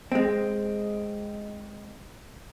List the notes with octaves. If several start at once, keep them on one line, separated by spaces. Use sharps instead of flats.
G#3 C4